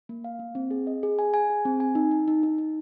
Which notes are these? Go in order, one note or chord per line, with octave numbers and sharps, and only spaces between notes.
A#3
F5
A#3
C4
G#4
D#5
G#4
G#5
G#5
G#4
C4
G#5
D#4
D#4
D#4
D#4
D#4